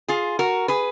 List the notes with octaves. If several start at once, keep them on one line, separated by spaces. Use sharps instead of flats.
F4 G#4
F#4 A#4
G#4 B4